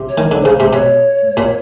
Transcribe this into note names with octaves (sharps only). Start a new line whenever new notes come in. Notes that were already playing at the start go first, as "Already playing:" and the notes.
Already playing: C3
C#5
D#3
D3
C#3 C5
C3
B2 C#5
A#2